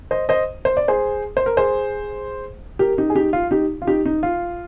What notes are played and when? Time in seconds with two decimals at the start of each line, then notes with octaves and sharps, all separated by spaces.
0.11 C5 D#5
0.29 C5 D#5
0.65 C5
0.77 D5
0.88 G#4 C5
1.37 C5
1.46 A#4
1.57 G#4 C5
2.79 G4 A#4
2.98 D#4 G4
3.10 G#4
3.15 D#4 G4
3.33 F4
3.51 D#4 G4
3.82 F4
3.87 D#4 G4
4.05 D#4
4.23 F4